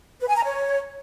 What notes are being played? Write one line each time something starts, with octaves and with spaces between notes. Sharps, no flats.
B4
G#5
A#5
C#5